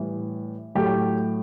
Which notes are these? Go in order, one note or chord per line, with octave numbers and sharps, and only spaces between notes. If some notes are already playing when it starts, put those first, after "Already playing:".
Already playing: A2 E3 G3
A2 F#3 A3 G4